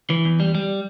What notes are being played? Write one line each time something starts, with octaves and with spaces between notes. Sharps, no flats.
E3
E2
G3
G3